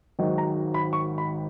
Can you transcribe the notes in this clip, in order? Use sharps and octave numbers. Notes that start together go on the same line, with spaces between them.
G#1 G#2 D#3 F#3
A#5
B5
C#6
B5